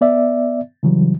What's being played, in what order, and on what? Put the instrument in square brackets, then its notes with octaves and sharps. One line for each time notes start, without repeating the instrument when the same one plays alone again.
[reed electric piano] B3 D5 E5
C#3 E3 F#3 G3